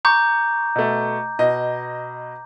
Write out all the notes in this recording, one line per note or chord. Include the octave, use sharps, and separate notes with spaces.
A#5 C#6 D6 G6
B2 A3
B2 D#5